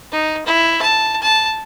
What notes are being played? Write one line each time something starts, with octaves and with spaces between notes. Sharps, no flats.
D#4
E4
A5
A5